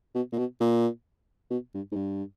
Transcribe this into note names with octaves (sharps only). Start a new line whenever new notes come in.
B2
A#2
B2
A#2
B2
G2
G#2
G2